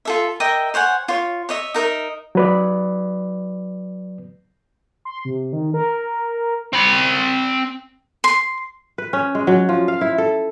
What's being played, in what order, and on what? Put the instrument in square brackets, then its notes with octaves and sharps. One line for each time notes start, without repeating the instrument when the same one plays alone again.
[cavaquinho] F4 A4 E5
A#4 D#5 E5 G5
C5 C#5 F#5 G#5
F4 C#5
C#5 D#5 E5
D#4 A#4 D#5 E5
[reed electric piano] F#3 B4 D5
[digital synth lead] C6
C3
D#3
A#4
[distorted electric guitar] C4 B5
[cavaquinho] C6
[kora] B4
C#4
G#3
F#3
F3
F5
E4
A4